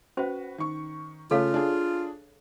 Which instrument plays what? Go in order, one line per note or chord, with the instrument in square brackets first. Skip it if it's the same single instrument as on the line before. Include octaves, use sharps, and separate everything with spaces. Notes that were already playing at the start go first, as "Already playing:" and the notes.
[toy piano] C#4 C5 [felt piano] F#4 B4
[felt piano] D#3 C#6
[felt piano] C#3 A3 C#4 [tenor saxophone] F4 [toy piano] A4 C#5 F5
[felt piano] D4 G#4